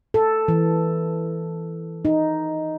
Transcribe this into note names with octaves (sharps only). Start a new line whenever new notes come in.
A4
E3
D#4